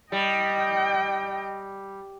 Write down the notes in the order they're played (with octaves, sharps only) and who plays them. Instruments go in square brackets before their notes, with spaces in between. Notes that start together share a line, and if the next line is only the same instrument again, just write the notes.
[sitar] G3 [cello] D#5 G5